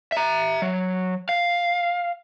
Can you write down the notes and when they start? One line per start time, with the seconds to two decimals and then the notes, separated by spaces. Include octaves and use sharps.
0.12 E5 A#5
0.62 F#3
1.29 F5